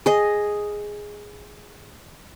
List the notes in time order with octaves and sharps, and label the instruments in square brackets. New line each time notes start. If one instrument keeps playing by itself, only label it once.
[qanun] G#4 D#5